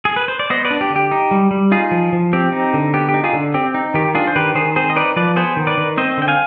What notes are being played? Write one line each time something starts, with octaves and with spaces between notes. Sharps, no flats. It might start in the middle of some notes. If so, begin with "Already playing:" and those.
G#4
B4
C5
D5
B3 C5 D#5
B4 D5
D4
G4
D3
G4
D#4
G3
G3
D#4 F4 G#4
F3
F3
C4 G4
D#4
D3
B3 G4
G4
D#4
F4 G#4
D3
C4 G4
D#4
D#3 G4
D4 F4 G#4
C5
D#3 G4 B4
D#3 G#4 C5
C4 G#4 C5
D#5
D#4 B4 D5
F3 B4 D5
B3 G#4 C5
D#3
B4 D5
D#3
C4 C5 D#5
D3 G5
F5 G#5